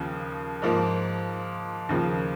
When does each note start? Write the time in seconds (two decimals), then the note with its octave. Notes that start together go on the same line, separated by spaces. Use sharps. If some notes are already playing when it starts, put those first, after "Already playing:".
Already playing: D#2 C#3 F3
0.62 G#2 F3 A#3
1.89 D#2 C#3 F3 A#3